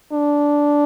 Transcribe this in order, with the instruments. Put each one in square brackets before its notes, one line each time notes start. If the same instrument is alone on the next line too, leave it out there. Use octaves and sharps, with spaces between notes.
[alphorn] D4